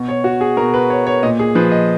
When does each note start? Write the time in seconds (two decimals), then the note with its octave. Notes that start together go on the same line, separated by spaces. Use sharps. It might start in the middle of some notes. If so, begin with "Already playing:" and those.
Already playing: B2
0.09 C#5
0.24 F#4
0.41 G#4
0.57 B2 A#4
0.74 B4
0.90 C#5
1.07 C#5
1.23 A#2 D#5
1.39 G#4
1.55 F3 B4
1.72 D#5